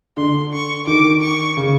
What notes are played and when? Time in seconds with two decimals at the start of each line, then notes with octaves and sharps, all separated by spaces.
0.17 D3 C6
0.53 C#6
0.87 D#3 D6
1.22 C#6
1.57 C#3